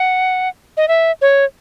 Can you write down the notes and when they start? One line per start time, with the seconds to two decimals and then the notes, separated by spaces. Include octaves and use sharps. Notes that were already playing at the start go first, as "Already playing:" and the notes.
Already playing: F#5
0.77 D#5
0.88 E5
1.21 C#5